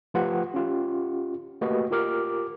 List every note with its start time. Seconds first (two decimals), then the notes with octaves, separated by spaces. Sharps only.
0.14 F3 A3 F4 G4 B4 F#5
0.54 C#4 F4 G4
1.61 A3 A#3 F#4 G4 B4 D#5
1.91 F4 G4 A#4 D6 F6